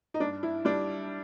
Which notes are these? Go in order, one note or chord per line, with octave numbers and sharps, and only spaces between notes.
D#4
G2 D4
E4
G3 D4